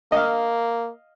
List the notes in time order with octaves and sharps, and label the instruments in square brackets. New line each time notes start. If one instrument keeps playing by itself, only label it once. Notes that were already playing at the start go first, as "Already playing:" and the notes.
[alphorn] A#3 [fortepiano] D#5 F5